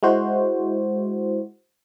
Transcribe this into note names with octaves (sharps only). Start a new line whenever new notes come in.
G#3 E4 F#4 C5